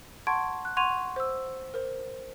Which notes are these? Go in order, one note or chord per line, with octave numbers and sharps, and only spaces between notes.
F#5 A5 C6 C#6 G#6 D7
F#6
F#5 C6 C#6 G#6 D#7 F7
C5 E6
A#4 C5